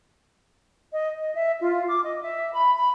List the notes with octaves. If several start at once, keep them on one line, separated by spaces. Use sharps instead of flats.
D#5
D#5
E5
F4
D6
D#5
E5
B5
B5